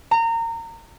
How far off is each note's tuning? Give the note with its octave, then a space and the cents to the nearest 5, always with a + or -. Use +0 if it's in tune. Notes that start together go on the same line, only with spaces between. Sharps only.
A#5 -25